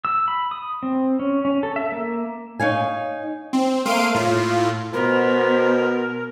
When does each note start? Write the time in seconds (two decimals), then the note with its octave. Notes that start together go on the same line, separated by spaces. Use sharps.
0.05 E6
0.28 B5
0.51 D#6
0.83 C4
1.19 C#4
1.45 C#4
1.63 A4
1.76 E5
1.92 A#3
2.60 D#4 C#5 F5 G#5
3.53 C4
3.85 A3 A#3 F5 C6 D7 D#7
4.15 A2 F4
4.93 B2 B3 A#4 C5